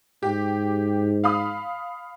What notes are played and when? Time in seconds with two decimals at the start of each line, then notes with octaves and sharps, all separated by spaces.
0.23 G#2 G4
1.24 F5 B5 D#6